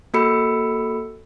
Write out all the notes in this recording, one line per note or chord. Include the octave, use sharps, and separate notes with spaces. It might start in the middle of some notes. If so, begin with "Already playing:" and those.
A#3 F#4 A4 B5 E6 C#7